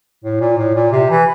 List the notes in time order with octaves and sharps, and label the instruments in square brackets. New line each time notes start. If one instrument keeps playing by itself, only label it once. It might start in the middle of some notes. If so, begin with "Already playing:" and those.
[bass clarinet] A2
A#2
A2
A#2
C3
E3